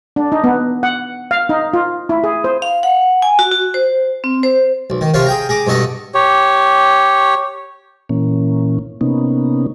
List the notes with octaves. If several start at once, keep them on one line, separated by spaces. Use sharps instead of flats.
D4
D#4
B3
F#5
F5
D#4
F4
E4
G#4
C5
F5
F#5
G#5
F#4
F#4
C5
C4
C5
B1
D#3
C3 F3 F4 C#5 F5
G#4 G5 A#5
G#4 A#5 D6
G2 B2 A4 D#5 F#5
G4 C#5
A#2 E3 A#3 C#4
C3 A#3 B3 C#4 D#4